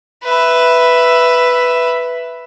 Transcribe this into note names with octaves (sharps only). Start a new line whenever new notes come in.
B4 E5